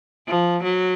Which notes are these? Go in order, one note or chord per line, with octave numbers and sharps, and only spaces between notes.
F3
F#3